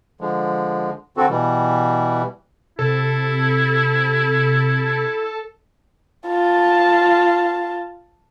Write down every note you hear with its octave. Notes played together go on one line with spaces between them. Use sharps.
D3 F3 G#3
D3 C4 F#4 A4
B2 E3 G3
C3 E4 A4
F4 A5